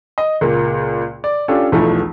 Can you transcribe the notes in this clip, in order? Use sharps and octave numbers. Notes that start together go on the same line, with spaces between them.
D#5
C#2 A#2 A#3
D5
C#4 D4 F4 G4 A4
B1 E2 E3 F3 A3